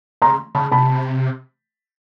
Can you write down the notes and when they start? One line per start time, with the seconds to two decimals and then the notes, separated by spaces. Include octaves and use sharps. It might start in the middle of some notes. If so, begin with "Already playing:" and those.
0.22 C#3 A#5 C6
0.55 C#3 A5 B5
0.72 C3 A5 B5